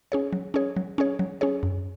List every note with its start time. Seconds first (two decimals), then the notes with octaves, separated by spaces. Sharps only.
0.12 C#4 G#4 C#5
0.33 F#3
0.54 C#4 G#4 C#5
0.76 F#3
0.98 C#4 G#4 C#5
1.19 F#3
1.41 C#4 G#4 C#5
1.63 F#2